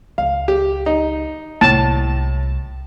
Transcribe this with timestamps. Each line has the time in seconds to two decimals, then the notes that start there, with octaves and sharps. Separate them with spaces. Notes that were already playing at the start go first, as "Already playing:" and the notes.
0.18 C#2 F5
0.48 G4
0.86 D#4
1.61 C2 A2 A5